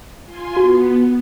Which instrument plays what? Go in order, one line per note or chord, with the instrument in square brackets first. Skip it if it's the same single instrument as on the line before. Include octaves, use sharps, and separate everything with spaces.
[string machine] F4 G#5 C6
[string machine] B3 [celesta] F#4